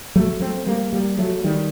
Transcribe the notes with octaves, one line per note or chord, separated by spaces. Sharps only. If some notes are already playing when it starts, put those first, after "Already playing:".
F#3 A3
A3 C4
G3 A#3
G3 A#3
F#3 A3
D#3 G3